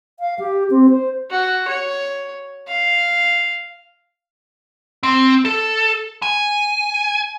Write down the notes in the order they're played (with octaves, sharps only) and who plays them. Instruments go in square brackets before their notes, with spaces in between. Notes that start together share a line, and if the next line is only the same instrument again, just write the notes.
[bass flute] F5
G4
C4
C5
[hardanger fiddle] F#4
C#5
F5
[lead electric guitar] C4
A4
G#5